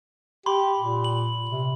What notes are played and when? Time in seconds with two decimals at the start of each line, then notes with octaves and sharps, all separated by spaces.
0.46 G4 B5 C6
0.78 A#2
1.04 F#7
1.50 C3